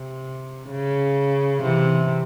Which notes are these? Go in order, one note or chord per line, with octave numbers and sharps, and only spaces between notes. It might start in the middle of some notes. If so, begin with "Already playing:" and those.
Already playing: C3
C#3
C3 E3